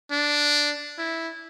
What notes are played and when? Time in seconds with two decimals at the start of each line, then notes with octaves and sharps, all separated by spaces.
0.11 D4
0.98 E4